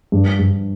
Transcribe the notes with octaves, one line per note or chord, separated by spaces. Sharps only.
G2
G2